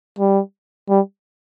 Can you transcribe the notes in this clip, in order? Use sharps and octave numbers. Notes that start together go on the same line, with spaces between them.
G3
G3